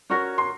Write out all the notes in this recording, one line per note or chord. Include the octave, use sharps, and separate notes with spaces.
C#4 F#4 A#4 C#5 C#6
C6